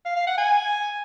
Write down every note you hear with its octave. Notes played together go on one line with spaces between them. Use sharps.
F5
F5
F#5
G#5